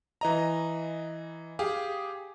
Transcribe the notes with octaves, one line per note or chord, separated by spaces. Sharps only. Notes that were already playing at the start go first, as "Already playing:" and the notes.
E3 D#5 A#5
G4 G#4 F5